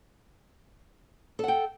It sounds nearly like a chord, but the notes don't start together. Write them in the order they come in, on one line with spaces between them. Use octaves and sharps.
A4 F#5 G5